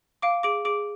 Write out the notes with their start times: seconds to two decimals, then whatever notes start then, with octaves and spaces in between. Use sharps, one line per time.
0.22 F5 D6 D7
0.43 G#4 D6 D7
0.65 G#4 D6 D7